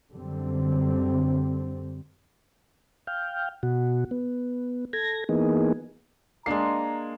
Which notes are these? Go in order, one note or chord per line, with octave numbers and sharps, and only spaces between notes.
F#2 D3 G3 C4
F5 G5
B2 F#4
B3
A4 G#6 A#6
E3 A#3 B3 D#4 G#4
G#3 A#3 D4 A#5 C7